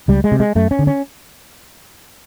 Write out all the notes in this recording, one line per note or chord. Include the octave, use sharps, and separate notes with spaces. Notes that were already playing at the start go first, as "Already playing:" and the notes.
C#2 G3
G#3
C3
G#3
F#2 A3
C#4
D3
C#4